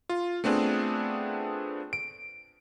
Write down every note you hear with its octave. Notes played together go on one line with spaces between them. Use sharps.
F4
A3 B3 C4 D4 F4 G#4
D7